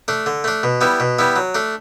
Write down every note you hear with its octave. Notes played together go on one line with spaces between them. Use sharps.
A3 D4
D3
A3 D4
B2
G3 B3 E4
B2
G3 B3 E4
F#3
A3 D4